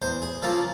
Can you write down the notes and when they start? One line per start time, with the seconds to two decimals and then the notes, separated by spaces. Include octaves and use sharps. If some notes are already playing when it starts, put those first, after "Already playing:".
0.02 E2 C5
0.22 G#4
0.42 C#3 F3 A#3 A4